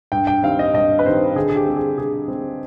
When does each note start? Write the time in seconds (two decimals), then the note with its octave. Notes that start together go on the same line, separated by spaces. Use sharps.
0.12 G2 G5
0.27 G5
0.43 D#3 G3 C4 F5
0.59 D#5
0.74 G2 D#5
0.99 B4
1.05 D#3 G3 C4 C5
1.35 D3 G#4
1.49 G#4
1.56 G4
1.67 G3 C4
1.77 G#4
1.98 D3 G#4
2.28 G3 C4